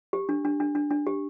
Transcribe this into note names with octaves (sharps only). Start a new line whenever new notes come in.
G4
D4
D4
D4
D4
D4
G4